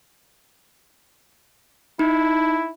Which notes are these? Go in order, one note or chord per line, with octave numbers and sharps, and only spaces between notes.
D#4 E4